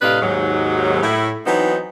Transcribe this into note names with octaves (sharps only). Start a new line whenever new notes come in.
A2 C3 D4 B4 D#5 F5
D#2 G#2 F#3
A2 E4
E3 F#3 B3 C4 D#4